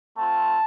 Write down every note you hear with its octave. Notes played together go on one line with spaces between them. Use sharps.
A3 C4 F4 A5